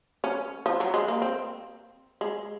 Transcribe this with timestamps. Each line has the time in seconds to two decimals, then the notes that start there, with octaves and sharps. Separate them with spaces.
0.24 C#4
0.66 F3
0.80 F#3
0.94 G#3
1.08 A#3
1.22 C4
2.21 G#3